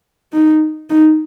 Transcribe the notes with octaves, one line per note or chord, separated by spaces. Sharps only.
D#4
D#4